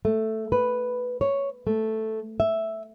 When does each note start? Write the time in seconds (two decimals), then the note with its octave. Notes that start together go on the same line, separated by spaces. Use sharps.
0.05 A3
0.52 B4
1.21 C#5
1.67 A3
2.40 E5